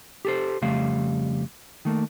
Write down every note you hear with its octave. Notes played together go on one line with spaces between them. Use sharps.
G4 A4 C5
F2 C#3 G3 A3 F5
D#3 A3 A#3